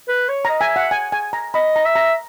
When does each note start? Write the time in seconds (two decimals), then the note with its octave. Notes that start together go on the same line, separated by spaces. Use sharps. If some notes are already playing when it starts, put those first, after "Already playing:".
0.08 B4
0.29 C#5
0.45 D#5 A#5
0.60 E5 G#5
0.76 F#5
0.91 G#5
1.12 G#5
1.33 A#5
1.54 D#5 B5
1.76 A#5
1.85 E5
1.95 A#5